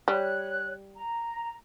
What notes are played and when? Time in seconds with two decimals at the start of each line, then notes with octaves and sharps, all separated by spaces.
0.08 G3 C#5 F#6
0.95 A#5